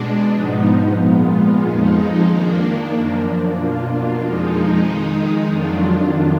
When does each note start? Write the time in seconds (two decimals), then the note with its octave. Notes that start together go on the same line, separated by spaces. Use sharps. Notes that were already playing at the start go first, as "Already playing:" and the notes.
Already playing: B2 G#3 D4
0.33 G#2 F3 B3 D#4
0.97 A#2 G#3 B3 F4
1.61 F2 F3 G#3 D#4
2.26 D#3 A#3 D4
2.90 F#2 F3 A#3 D4
3.54 B2 A#3 D4 F4
4.19 F2 F3 G#3 D#4
4.83 D#3 G#3 D#4
5.48 F2 D#3 F#3 D4 F4